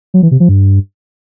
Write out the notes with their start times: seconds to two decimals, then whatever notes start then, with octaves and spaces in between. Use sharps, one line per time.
0.14 F#3
0.23 E3
0.31 C3
0.40 F3
0.49 G2